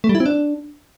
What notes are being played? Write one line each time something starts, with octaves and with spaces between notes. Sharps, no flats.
A3
G3
E4
C4
D4